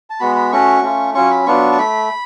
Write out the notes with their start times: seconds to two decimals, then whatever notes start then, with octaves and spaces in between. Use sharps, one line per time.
0.10 A5
0.20 G#3 B3 F#4 B5
0.35 B5
0.52 A3 C#4 F#4 C#6
0.82 A3 C#4 F4
1.14 F#3 C#4 F4 C#6
1.31 B5
1.46 F#3 B3 D4 F4 C#6
1.72 A5
1.78 A3 B5